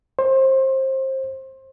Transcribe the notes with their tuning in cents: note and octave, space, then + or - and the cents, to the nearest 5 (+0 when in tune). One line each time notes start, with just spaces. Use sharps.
C5 +25